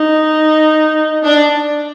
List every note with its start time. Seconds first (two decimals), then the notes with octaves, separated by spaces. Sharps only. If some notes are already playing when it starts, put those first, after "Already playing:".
Already playing: D#4
1.24 D4